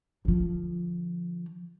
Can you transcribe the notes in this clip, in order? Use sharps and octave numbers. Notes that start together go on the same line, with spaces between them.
D3 F3